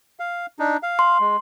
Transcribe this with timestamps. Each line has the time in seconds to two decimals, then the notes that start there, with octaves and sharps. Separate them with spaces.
0.20 F5
0.59 D4 D#4
0.83 F5
0.99 C6
1.20 G#3